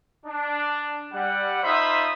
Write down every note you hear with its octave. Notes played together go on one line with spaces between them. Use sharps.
D4
G3 F#5
D#4 F4 C5 E5 B5 D#6